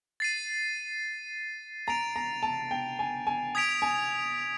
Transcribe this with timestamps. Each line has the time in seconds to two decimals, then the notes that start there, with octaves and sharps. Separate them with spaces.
0.20 A6 C7 D#7
1.87 A#5 A6 D7 F7
2.16 A#5
2.43 A5
2.71 G5
2.99 G#5
3.27 G#5
3.55 D#6 G#6 B6 D7 F7
3.82 G#5